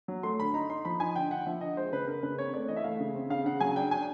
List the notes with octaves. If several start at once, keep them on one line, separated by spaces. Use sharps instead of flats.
F#3
A3 C6
D3 B5
D#4 A#5
D#4 C6
F3 B5
D#4 G#5
D3 G5
D3 F#5
F3 E5
D3 D#5
G#3 C5
C#3 B4
C#3 A#4
C#3 B4
C4 C#5
A3 D5
E3 D#5
E5
A3 F5
C#3
C4
C#3 F5
C#3 F#5
F#3 G#5
D4 G5
D4 G#5